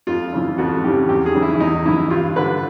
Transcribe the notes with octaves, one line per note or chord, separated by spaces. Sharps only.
F2 F4
C#3 E3
F2 F#4
C#3 E3 G4
E2 G4
G#4
C#3 E3
E4
E4
E2 D#4
C#3 E3 E4
G2 F4
D3 B4